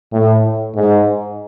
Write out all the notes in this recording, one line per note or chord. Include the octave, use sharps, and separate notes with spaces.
A2
G#2